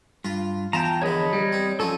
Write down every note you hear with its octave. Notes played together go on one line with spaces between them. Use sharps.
G2 F4
E2 F4 G5 A5 A#5
A#1 D3 C#5 D#5 B5
G3
C4
F3 C#4 A4 G#5